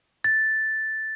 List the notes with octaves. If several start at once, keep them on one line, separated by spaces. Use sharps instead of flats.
A6